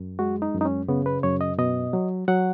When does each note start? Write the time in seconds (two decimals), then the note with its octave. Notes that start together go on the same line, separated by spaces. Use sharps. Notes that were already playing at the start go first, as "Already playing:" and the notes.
Already playing: F#2
0.19 G#3 F#4
0.42 D#4
0.54 F#2
0.61 D#4
0.65 C#4
0.88 C#3 B3
1.06 B4
1.23 F#2 C#5
1.41 D#5
1.58 B2 D#5
1.93 F#3
2.28 F#3 F#5